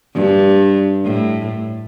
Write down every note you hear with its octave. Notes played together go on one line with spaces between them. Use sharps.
G2
A2